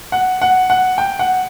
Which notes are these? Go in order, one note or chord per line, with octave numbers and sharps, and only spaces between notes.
F#5
F#5
F#5
G5
F#5